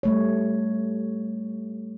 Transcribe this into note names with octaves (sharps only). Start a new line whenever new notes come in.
G3 A3 C#5